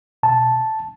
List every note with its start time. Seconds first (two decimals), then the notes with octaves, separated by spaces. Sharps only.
0.23 B2 A5